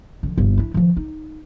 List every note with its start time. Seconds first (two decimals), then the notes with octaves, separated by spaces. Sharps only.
0.23 D3 F3
0.38 G1 A#2
0.58 D4 E4
0.74 D#3 F3
0.97 D#4